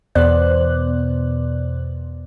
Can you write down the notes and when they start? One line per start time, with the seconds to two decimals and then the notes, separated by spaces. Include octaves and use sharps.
0.15 E2 B2 B3 C5 D5 F#6